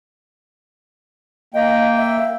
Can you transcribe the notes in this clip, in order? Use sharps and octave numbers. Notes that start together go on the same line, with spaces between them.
A#3 D#5 G5
E5